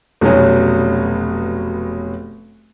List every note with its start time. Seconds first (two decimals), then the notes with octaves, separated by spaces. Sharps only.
0.21 F1 B2 F#3 C#4